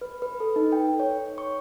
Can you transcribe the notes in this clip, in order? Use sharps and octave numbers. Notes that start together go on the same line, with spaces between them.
B4
B4
A4
D#4
G5
C#5
C#6